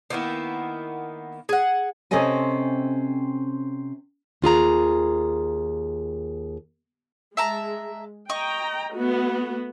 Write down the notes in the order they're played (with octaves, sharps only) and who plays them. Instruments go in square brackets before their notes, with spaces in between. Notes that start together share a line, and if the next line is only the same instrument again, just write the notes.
[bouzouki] D#3 A#3 B3 E4
G#4 F#5
[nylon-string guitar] C3 C4 C#4 A4 D#5 G#5
[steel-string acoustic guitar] D#2 F4 G#4 A#5
[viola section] G#3 [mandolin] E5 A5 A#5
[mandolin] D#5 C#6 [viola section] G5 A#5
[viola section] A3 B3 F#4